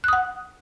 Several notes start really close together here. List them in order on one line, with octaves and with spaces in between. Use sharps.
F#6 D#6 F#5